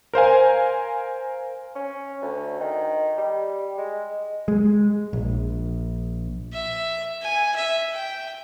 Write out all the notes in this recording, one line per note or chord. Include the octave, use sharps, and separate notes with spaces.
A#4 C5 F5 G#5
C#4
D2
D#3
G3
G#3
G#3
A#1
E5
G#5
E5
G5